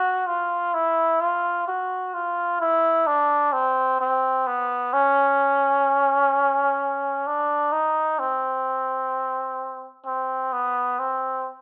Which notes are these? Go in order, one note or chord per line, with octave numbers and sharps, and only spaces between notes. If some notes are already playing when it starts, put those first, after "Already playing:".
Already playing: F#4
F4
E4
F4
F#4
F4
E4
D4
C4
C4
B3
C#4
D4
D#4
C4
C4
B3
C4